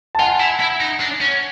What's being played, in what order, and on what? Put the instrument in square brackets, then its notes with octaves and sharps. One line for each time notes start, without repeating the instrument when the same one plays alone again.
[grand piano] A5
[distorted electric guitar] F4 [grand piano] F#5 G#5
[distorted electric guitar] E4
E4
D#4
D4
C#4